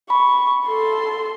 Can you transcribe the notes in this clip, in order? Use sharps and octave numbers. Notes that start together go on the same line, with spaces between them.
B5 C#6
A4 C6